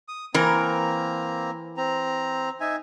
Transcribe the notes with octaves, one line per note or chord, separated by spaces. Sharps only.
D#6
E3 A#3 C4 A#4 A#5
C4 A#5
D#4 E5 G#5